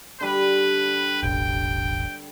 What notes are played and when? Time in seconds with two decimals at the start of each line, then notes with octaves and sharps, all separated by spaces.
0.21 D3 G3 B4 B5
1.23 E1 A1 G5